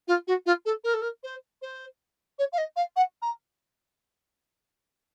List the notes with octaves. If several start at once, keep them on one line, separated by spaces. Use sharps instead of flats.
F4
F#4
F4
A4
A#4
A4
A#4
C5
C5
C#5
F5
D#5
F5
F#5
A#5